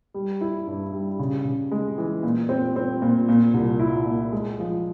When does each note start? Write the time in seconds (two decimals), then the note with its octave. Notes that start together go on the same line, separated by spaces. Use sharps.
0.14 G3
0.41 E4
0.67 G2
0.92 G3
1.19 C#3
1.45 C#3
1.72 G#3
1.98 E3
2.23 A#2
2.49 C4
2.76 C4
3.02 A#2
3.29 A#2
3.54 C2
3.80 E4
4.06 A#2
4.32 G#3
4.59 F3